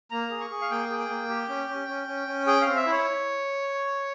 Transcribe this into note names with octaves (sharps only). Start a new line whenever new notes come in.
A#3 A#5
G#4
C#6
G#4
F5
A#3 G5
G#4
G5
A#3
G4
C#4
C#4
C#4
C#4
C#4
G#4 G5
C4 F5
E5
E4
C#5